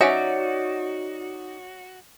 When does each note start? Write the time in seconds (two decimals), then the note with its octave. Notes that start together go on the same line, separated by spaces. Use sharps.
0.01 F#3 C#4 D#4 F#4 D5 E5